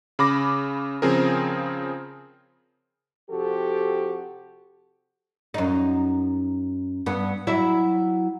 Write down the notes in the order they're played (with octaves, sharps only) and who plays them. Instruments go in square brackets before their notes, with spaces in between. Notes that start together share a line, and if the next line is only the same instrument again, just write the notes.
[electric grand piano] C#3 B5 D6 A#6
C#3 F3 C4 G#4 A#4
[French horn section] C3 F3 F#4 G4 A4
[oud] F#2 D#4
G2 B3
F#3 E4 E5